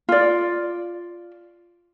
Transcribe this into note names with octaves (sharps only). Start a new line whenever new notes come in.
F4 D5